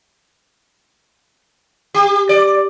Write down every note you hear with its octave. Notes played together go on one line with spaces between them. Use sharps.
G4
D5